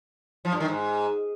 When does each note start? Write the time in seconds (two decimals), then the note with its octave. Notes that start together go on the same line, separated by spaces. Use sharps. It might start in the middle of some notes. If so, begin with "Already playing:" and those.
0.45 F3
0.53 G2
0.60 D#3
0.68 G#2